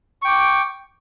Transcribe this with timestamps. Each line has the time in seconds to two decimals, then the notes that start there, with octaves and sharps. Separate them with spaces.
0.22 C#6
0.25 G5
0.28 D6